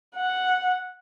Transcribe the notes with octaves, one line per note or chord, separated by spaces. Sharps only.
F#5